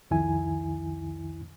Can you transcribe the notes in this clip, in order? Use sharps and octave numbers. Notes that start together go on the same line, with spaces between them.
C2 F2 D#3 E4 G#5